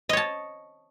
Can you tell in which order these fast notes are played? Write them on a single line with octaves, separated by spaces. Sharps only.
D#5 C#5 A5